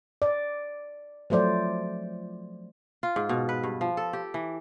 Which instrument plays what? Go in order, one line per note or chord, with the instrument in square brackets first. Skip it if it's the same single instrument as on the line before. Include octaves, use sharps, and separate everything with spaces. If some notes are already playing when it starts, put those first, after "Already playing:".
[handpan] D5
F3 F#3 A3 C5 D5
[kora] F4
G#2
B2
B4
G2
F3
A4
G4
E3